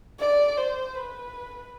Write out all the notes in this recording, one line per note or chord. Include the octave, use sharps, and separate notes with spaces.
D5
C5
B4